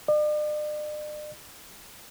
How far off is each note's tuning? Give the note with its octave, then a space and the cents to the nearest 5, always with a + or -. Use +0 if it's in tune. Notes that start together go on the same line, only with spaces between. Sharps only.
D5 +45